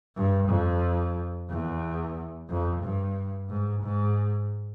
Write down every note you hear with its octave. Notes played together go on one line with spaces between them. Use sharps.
G2
F2
E2
F2
G2
G#2
G#2